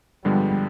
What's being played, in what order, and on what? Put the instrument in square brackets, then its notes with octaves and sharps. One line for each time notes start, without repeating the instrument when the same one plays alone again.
[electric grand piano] G2 D3 F3 G#3 B3 [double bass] G3